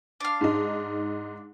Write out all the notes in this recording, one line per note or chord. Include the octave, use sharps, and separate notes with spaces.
D4 F5
G#2 D#4